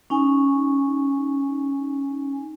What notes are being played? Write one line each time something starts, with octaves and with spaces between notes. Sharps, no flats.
C#4 D#4 G#5